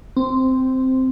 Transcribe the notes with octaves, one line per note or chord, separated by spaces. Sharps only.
C4